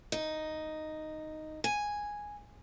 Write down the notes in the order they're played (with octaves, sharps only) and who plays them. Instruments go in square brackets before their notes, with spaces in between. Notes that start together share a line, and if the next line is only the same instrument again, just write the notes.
[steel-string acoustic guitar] D#4
G#5